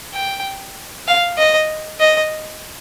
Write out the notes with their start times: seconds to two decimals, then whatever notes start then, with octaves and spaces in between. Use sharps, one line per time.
0.13 G5
1.07 F5
1.38 D#5
2.00 D#5